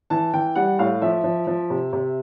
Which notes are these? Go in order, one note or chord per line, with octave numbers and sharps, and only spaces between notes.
E3 A5
E3 G5
G3 F#5
A2 F5
F3 E5
F3
F3
C3
C3